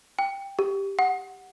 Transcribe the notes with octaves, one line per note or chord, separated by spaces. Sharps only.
G5
G4
F#5